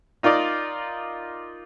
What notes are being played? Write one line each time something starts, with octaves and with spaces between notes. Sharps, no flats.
D#4 F4 A#4 D5 D#5